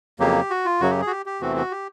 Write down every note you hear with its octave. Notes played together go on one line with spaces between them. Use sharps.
F2 C#3 F#3 A#3 G4
F#4
F4
F#2 C#3 F#3 F#4
G4
G#4
F#4
G4
G4
E2 C3 E3 A3 C4 F#4
F#4
G4